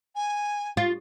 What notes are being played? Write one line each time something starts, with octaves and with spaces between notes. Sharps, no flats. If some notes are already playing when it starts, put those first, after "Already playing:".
G#5
F4